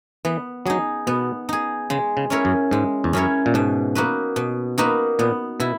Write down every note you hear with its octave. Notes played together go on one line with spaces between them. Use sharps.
E3 B3
F#3 D#4 G#4
B2 B3
D#4 G#4
C#3 G#3
C#3
C#4 E4 A#4 C#5
F#2
G#2 G#3
E2
F#2 C#4 E4 A#4 C#5
A#2
G#2 B2
A#3 D#4 F#4 B4
B2
A#3 D#4 F#4 B4
A#2 B3
B2 E4